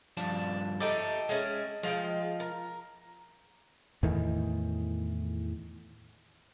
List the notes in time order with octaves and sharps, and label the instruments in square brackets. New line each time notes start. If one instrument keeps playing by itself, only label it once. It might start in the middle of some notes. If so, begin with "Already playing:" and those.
[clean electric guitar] G2 F3 A5 [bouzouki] D4
[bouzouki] A3 D#4 G4 [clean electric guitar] A4 G5
[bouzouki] G#3 A3 C#4
[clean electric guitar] F3 F4 [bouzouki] G#3 G5
[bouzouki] A#4
[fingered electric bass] E2 A2 D#3 E3